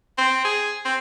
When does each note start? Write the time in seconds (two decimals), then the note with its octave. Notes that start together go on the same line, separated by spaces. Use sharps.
0.18 C4
0.45 G#4
0.85 C4